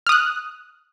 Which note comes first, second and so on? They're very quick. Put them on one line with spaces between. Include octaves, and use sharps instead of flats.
F6 D#6 F#6